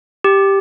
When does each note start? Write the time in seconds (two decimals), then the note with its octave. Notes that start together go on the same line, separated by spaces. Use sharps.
0.24 G4